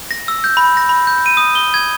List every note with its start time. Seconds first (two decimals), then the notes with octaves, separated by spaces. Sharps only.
0.11 A#6
0.28 E6
0.44 G6
0.57 B5
0.77 A#6
0.89 B5
1.07 G6
1.26 D#7
1.37 D#6
1.55 G7
1.74 G#6